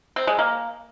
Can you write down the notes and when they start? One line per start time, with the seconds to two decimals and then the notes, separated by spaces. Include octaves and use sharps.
0.16 C4
0.27 G#3
0.39 A#3